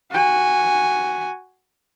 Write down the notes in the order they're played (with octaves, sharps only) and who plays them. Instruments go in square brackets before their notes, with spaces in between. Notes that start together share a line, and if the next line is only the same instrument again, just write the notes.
[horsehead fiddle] F#4 G#5